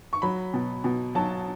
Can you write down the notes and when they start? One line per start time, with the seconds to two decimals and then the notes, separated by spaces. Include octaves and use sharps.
0.13 C#6
0.22 F#3 B5
0.54 B2
0.84 B2
1.15 F#3 A5